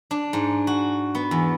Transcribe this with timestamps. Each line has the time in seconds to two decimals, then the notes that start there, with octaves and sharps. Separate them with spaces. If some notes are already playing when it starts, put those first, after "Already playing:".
0.11 D4
0.33 G#2
0.67 F#4
1.15 B3
1.31 E2